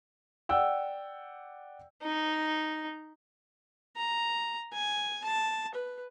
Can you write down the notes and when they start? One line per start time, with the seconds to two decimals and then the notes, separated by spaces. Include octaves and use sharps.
0.49 D5 F#5 G5 E6
2.03 D#4
3.96 A#5
4.73 G#5
5.24 A5
5.75 B4